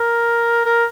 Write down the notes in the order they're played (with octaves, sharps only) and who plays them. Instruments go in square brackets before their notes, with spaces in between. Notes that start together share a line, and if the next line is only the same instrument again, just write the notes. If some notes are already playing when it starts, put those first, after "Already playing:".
Already playing: [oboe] A#4
A#4